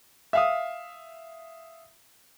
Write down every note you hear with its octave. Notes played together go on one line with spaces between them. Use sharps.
E5 F5 D#6